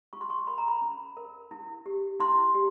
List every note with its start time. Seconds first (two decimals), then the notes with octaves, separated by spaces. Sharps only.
0.13 F4 C#6
0.21 C6
0.30 C#6
0.47 A#4 B5
0.58 A#5
0.68 B5
0.82 C#4
1.17 A#4
1.51 E4
1.86 G4
2.20 E4 C6
2.55 G4